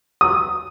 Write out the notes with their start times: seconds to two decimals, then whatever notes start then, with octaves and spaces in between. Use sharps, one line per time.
0.21 D#6